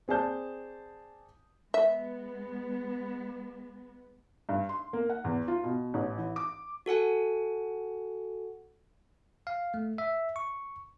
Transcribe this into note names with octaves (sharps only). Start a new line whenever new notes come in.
C4 G#4 D5 A5 G6
G#3 B3 E5
G2
C6
A#3
F#5
E2
F4
B2
A1
E3
D6
F#4 A4 F#5 G#5
F5
A3
E5
C#6